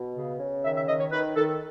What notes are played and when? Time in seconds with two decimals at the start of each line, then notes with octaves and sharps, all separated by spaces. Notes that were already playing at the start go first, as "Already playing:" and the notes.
Already playing: B2
0.16 C#3
0.39 C#3
0.63 D#3 E5
0.76 E5
0.87 D#3 D#5
1.00 C#5
1.11 D#3 B4
1.35 D#3 A4